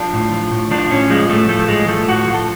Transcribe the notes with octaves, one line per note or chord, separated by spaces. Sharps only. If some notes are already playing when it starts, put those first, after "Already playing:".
Already playing: F3 D4
A2
F3
A2
F3 D4
A2 C#4
F3 G#3
A2 A3
F3 A3
A2 G#3
F3 A3
A2 F#4
F3
A4